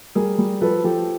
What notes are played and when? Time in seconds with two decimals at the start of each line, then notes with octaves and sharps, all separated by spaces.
0.15 G3 G#4 A#4
0.38 G3
0.61 F3 A4 B4
0.84 F3 G4 A4